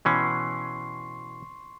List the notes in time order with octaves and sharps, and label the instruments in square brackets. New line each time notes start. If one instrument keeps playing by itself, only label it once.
[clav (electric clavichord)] B2 E3 C#4 [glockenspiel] C6 C#6 C7